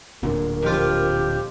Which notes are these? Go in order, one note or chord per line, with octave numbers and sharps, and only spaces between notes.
D1 A#2 D3 A#4
F2 F4 G4